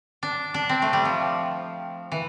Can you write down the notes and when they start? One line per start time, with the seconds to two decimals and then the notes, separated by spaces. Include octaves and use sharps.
0.23 D4
0.54 D4
0.69 C4
0.82 A3
0.93 G3
1.05 F3
2.12 E3